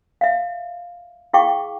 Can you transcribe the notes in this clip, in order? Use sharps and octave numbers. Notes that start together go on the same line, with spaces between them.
E5 F5
E4 G#4 F5 G5 C#6 D6